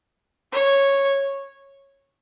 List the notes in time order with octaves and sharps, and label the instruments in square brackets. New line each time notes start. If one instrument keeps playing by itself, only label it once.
[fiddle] C#5